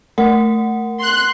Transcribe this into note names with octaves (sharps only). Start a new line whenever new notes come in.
A3 A#4 F#5
C6 F#6